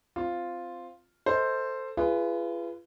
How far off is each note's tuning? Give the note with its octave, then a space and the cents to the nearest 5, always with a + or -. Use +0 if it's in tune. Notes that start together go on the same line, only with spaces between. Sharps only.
C4 -5 F4 +0
A4 +20 C5 +0 D#5 +30
F4 -35 G#4 +0 B4 +0